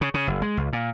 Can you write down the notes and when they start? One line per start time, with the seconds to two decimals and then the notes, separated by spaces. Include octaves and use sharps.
0.01 C#3
0.14 C#3
0.27 F#1
0.42 G#3
0.57 C#2
0.73 A#2